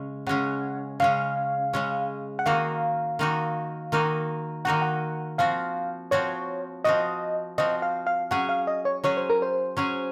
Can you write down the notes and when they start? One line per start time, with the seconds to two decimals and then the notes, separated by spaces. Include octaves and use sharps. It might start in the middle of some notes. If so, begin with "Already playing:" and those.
Already playing: C#3 G#3 C#4
0.27 C#3 G#3 C#4 F#5
1.00 C#3 G#3 C#4 F5
1.73 C#3 G#3 C#4
2.39 F#5
2.46 D#3 A#3 D#4 F#4 F5
3.19 D#3 A#3 D#4 F#4
3.92 D#3 A#3 D#4 F#4
4.65 D#3 A#3 D#4 F#4 F#5
4.82 F#5
5.38 F3 C4 F#4 F5
6.11 F3 C4 F#4 C#5
6.84 F3 C4 F#4 D#5
7.58 F3 C4 F#4 D#5
7.82 F5
8.07 F5
8.31 F#3 C#4 G#4 F#5
8.49 F5
8.67 D#5
8.85 C#5
9.04 F#3 C#4 G#4 C#5
9.17 C5
9.30 A#4
9.42 C5
9.77 F#3 C#4 G#4